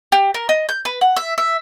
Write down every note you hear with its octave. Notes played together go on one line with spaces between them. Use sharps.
G4
A#4
D#5
G6
B4
F#5
E5
E5